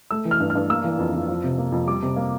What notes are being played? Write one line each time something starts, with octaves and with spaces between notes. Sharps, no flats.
A3 E6
E3
F6
G2
F6
G2
A#3 E6
E3
F2
F2
F3
C3
A#3
F2
G3 D6
C3
A#3